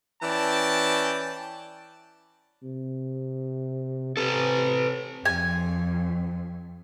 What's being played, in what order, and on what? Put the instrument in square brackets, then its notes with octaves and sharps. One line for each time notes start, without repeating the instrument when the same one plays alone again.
[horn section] E3 C#4 D5 G5 A5
[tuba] C3
[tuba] C3 [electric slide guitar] A4 B4
[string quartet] F2 [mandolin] G#5